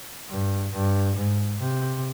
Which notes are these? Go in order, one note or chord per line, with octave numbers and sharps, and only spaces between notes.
G2
G2
G#2
C3